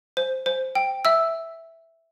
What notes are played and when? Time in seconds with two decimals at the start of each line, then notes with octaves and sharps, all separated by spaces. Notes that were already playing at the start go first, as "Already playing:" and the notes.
0.17 C5
0.46 C5
0.75 G5
1.05 E5 E6